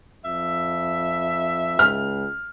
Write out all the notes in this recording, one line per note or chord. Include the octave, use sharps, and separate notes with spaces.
F2 E5
C#2 F6